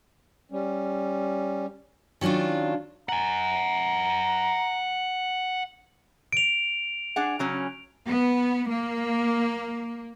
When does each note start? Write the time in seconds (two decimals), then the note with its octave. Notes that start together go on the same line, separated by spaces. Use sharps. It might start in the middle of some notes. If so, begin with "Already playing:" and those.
0.51 G3 C#4
2.21 D#3 F#3 C#4 D4 F4
3.09 F#5 G#5 A#5
6.33 D7 F7
7.16 D4 G#4 F#5
7.39 C#3 F#3 C#4
8.07 B3
8.69 A#3